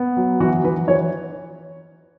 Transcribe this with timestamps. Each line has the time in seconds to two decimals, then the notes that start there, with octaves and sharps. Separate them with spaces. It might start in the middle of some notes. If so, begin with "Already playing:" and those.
Already playing: B3
0.17 F#3
0.40 E3 F#4
0.64 E3 B4
0.88 E3 C#5